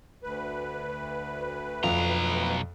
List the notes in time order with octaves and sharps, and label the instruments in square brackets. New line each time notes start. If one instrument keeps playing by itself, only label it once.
[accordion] D2 B4
[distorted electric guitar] B1 A#5 [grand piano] F2